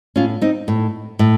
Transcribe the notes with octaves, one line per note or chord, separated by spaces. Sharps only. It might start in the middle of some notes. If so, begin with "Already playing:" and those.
A2 C#4 F4
C4 D#4
A2
A2